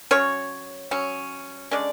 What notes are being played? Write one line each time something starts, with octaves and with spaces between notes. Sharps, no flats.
F#3 C#4 C#5
F#3 C#4
D3 G#3 C#4 D5